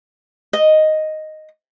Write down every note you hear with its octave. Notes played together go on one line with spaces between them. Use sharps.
D#5